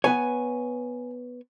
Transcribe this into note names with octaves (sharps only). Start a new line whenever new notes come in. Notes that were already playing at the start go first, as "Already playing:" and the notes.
B3 B4 C#5 G#5